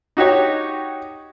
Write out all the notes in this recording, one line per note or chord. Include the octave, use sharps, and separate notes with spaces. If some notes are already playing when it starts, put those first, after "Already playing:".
D#4 F#4 G4 C#5